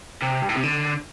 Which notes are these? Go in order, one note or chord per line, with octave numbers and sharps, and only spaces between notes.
C3
G2
A2
C3
D3